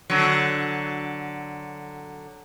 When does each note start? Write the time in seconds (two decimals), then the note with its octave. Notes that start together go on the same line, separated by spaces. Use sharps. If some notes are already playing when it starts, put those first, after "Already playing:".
0.10 D3 F#3